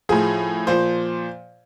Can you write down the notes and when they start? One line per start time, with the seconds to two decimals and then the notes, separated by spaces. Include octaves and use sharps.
0.09 A2 F3 G#4
0.67 A#2 F3 C5